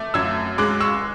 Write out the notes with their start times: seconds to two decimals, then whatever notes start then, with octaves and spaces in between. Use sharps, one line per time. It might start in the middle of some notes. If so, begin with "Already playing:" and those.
Already playing: A3 D6
0.14 F#2 E6 G#6
0.58 G#3 D6 F#6
0.80 C#6 E6